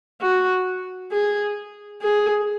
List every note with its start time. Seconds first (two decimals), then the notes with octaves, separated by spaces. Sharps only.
0.21 F#4
1.12 G#4
2.02 G#4